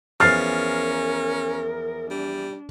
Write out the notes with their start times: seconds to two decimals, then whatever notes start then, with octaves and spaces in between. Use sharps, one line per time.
0.20 E2 F3 C#4 A#4 F6 A6 C7
2.10 G3 D4